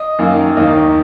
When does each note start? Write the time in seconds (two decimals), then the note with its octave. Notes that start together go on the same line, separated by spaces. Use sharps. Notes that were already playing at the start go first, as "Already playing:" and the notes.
Already playing: D#5
0.19 F#2 D#3 A#3
0.57 D#2 D#3 A#3 D#5